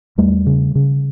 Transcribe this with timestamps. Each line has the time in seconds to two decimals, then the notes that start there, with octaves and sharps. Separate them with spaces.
0.18 E2 G3 A3
0.46 C#3
0.75 C#3